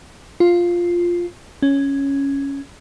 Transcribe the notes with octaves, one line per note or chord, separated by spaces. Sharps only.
F4
C#4